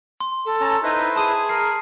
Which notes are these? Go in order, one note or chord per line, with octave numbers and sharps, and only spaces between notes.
C6
A4
C#4 A5 A#5
D#4 E4 B4 C5
G#4 A5 D#6 D#7
A#4 C7